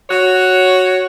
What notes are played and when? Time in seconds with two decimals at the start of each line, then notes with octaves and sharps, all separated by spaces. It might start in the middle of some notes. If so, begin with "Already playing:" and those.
0.10 F#4 C#5